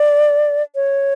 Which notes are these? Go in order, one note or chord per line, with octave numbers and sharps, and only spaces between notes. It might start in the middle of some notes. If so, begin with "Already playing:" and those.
Already playing: D5
C#5